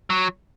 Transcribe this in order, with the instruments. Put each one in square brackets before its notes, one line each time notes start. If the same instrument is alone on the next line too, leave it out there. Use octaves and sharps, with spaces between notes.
[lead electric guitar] F#3